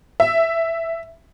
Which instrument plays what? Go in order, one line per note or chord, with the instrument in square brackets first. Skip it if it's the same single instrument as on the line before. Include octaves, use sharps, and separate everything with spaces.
[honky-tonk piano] E5